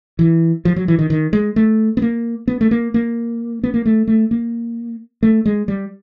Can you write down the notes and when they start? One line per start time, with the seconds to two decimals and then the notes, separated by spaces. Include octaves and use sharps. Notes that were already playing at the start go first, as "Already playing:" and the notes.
0.19 E3
0.65 F3
0.76 F#3
0.88 E3
0.99 D#3
1.10 D#3
1.33 G#3
1.56 A3
1.97 B3
2.02 A#3
2.48 B3
2.61 A3
2.71 A#3
2.94 A#3
3.64 B3
3.74 A#3
3.86 A3
4.07 A3
4.31 A#3
5.23 A3
5.46 G#3
5.68 G3